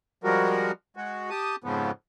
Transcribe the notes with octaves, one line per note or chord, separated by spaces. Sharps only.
F3 G3 G#3 F#4 A#4
G#3 F#4
G4 A5 D#6
F2 G#2 C#3 F3 B3